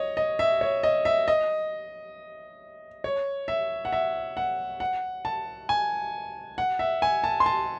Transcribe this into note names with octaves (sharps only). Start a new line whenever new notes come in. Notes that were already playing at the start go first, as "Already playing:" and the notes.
Already playing: C#5 D#5
D#5
E5
C#5
D#5
E5
D#5
C#5
E5
F#5
E5
F#5
F#5
A5
G#5
F#5
E5
G#5
A5
C6
A5